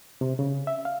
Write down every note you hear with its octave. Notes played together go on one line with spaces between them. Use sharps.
C3
C#3
E5
F5